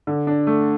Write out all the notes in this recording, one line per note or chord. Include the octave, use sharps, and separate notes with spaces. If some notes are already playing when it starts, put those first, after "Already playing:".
D3
D4
A3